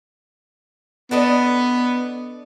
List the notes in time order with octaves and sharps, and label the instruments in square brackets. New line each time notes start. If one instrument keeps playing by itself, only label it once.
[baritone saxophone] B3 [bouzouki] D4 A4 D#5